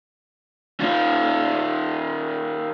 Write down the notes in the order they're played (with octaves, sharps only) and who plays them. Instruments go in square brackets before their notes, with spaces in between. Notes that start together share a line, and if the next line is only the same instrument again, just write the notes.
[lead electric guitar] D#3 F4